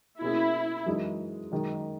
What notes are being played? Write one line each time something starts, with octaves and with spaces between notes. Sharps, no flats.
B2 A#3 C#4 E4 G#4
F#2 E3 G#3 D#4
F#2 D#3 G#3 D#4